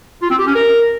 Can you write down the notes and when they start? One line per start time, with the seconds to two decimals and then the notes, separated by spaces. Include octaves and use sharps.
0.22 F4
0.30 C4
0.39 G4
0.47 C#4
0.55 A#4